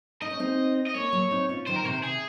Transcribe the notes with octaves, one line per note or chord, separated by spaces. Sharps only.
D#4 D#5
C#4
C4 D#4
D#5
A#3 C#4 C#5
F#3 A#3
C4 D#4
C#4 F4
D#3 F#3 C5
A#4
C3 D#3 C5
C3 G#4